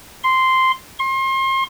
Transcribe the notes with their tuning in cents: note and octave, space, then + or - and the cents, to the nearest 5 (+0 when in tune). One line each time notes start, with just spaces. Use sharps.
C6 -5
C6 +35